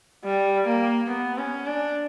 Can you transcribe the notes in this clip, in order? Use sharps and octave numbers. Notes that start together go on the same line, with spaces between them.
G3
A#3
B3
C#4
D4